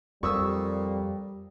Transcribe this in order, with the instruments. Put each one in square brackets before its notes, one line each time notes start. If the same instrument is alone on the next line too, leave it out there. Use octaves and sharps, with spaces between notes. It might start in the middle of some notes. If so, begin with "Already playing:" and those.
[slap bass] F2 [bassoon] A#2 [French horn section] G3 [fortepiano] C#6 D#6 E6